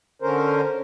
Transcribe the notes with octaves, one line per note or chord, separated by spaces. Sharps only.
D3 C#4 A#4 C5